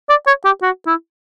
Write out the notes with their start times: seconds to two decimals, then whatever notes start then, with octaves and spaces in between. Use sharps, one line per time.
0.09 D5
0.27 C#5
0.45 G4
0.63 F#4
0.87 E4